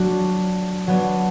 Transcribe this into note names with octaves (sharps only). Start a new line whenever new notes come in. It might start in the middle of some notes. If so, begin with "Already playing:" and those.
Already playing: F#3 D4 F#4
F#3 B3 D4